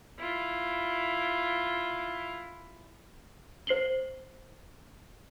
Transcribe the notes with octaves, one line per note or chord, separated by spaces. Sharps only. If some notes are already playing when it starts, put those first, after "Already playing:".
E4 F4
C5 C7 F#7 G7